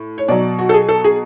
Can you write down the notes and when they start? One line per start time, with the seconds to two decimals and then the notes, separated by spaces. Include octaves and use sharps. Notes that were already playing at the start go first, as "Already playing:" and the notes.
Already playing: A2
0.18 C#5
0.28 B2 F#3 D5
0.59 F#4
0.69 A4
0.74 G#4
0.89 A4
1.04 G#4